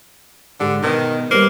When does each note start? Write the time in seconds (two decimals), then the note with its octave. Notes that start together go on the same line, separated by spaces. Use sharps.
0.60 G#2 D3 G4
0.82 B2 D#3 D#5
1.31 G3 A#3 B4 C5